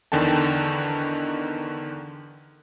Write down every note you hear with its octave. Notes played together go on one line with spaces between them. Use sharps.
E2 D3 D#3 G5 A5